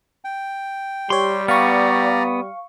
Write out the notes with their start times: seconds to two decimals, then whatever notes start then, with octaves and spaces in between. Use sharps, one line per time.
0.25 G5
1.10 G3 G4 C#5 C6
1.48 B3 D5 F5 A#5 C#6